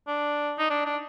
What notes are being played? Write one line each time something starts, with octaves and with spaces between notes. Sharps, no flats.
D4
D#4
D4
D4